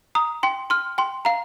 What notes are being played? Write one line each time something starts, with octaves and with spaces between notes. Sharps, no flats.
A#5 D#6
G5 C6
C6 F6
G5 C6
F5 A#5